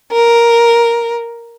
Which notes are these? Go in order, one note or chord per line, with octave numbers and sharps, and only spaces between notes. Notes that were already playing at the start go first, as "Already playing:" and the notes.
A#4